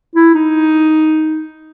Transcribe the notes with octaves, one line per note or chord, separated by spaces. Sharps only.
E4
D#4